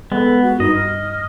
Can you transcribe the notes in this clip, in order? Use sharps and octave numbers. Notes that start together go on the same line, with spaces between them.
G#3 B3 A4
F#4
G2 D#4 D#5
F6